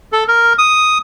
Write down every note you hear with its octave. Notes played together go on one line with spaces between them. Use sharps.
A4
A#4
D#6